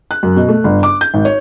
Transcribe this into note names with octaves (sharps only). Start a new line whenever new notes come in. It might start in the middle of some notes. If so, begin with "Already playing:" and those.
F#6
F#2
B2
A3
G1
D6
G6
G#1
C#5